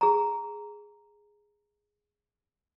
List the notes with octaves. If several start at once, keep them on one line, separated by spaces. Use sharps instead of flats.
G#4 A#5